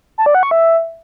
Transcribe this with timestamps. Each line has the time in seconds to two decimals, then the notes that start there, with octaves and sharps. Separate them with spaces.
0.18 A5
0.26 D5
0.35 F#5
0.43 C#6
0.51 E5